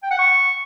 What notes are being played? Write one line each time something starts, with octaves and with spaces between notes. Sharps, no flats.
G5
F#5
C#6